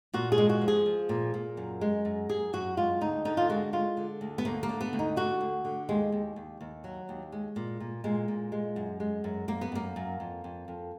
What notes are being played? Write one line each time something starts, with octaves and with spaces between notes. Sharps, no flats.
A#2 F#4
G#4
G#3
F#4
F3
G#4
F3
A#2
A#2
F#2
G#3
F#2
F#2 G#4
F#2 F#4
G#3 F4
D2 D#4
D3 D#4
F4
G#3 F#4
G#3 F4
D3
D2
B3
D2 A#3
A#3
D3
B3
D2
D#4
D3 F#4
D2
D3
D#2 G#3
D#2
D#2
D#2
F#3
D#2
G#3
A#2
A#2
A#2 G#3
A#2
G#3
F#2
G#3
F#2
F#2 A#3
B3
F#2 A#3
F#2
F2
F2
F2